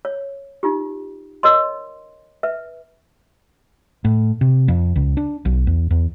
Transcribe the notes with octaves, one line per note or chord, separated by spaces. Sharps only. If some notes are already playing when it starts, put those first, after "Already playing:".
C#5
D#4 F4 G4
A#4 C#5 D#5 C6
B4 E5
A2
C3
F2
C#2
D4
B1
E2
E2